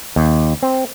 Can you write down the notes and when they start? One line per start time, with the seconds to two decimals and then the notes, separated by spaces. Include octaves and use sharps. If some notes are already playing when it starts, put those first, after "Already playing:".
0.16 D#2
0.63 C4